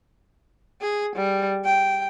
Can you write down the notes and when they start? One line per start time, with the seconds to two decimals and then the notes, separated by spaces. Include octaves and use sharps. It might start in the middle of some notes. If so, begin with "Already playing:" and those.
0.82 G#4
1.16 G3
1.65 G5